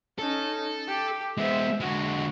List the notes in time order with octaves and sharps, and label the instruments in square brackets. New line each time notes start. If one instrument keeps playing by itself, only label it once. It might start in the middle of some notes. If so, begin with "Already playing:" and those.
[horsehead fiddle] C#4 D#4 [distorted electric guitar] A4
[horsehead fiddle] G4
[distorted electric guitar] G#3 B3 [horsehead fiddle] C5 E5
[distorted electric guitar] D3 G#3 [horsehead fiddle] F#4